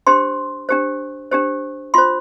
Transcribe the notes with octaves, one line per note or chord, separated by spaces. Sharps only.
D4 G4 C5 C6
D4 G4 C5
D4 G4 C5
F4 C5 C6